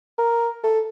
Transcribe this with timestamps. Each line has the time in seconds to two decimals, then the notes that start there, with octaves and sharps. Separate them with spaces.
0.18 A#4
0.64 A4